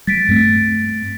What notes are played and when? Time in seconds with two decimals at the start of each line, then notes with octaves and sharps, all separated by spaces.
0.07 G3 A6 B6 D7
0.28 G2 A3 C4